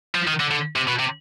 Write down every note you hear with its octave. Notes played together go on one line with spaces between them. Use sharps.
F3
D#3
D3
D3
C3
B2
C3